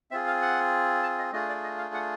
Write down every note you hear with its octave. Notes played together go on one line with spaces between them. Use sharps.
C4 F4 G#4 E5
F5
F#5
A5
D#5
A3 D4 F4 G#4 D#5
D5
D#5
F5
F#5